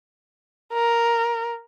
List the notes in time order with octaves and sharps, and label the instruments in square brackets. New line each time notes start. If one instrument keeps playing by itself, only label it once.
[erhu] A#4